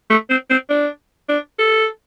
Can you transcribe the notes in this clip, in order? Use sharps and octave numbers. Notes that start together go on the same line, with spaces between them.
A3
C4
C4
D4
D4
A4